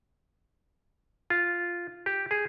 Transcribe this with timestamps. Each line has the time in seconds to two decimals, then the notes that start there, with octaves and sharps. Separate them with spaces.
1.30 F4
2.06 G4
2.31 G#4